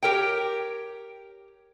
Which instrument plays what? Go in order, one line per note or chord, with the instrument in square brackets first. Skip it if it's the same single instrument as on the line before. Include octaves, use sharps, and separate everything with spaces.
[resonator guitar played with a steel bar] G4 A#4 C#5 G5